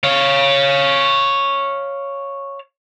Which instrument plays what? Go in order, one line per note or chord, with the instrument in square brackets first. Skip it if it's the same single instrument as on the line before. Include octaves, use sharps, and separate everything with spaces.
[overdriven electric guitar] C#5 F5